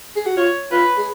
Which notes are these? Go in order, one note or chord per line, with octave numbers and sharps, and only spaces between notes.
G#4
F#4
F4 C#5
F4 B4
G#4